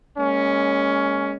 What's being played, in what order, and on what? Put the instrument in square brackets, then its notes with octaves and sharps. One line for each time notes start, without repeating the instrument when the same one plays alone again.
[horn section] G#3 A#3 C#4